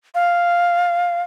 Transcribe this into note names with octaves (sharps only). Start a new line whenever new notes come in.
F5